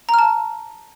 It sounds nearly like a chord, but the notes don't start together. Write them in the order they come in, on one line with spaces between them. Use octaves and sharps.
A#5 F6 A5